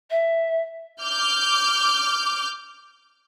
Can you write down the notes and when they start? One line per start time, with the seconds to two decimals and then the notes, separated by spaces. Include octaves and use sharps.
0.11 E5
1.02 D6 F6 G6